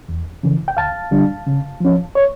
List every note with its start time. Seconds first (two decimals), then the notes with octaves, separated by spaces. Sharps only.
0.09 E2
0.43 C#3 E3
0.68 G5
0.77 D2 F5 A5
1.11 D3 G3 D4
1.47 C#3
1.80 F3 C#4
2.15 C#5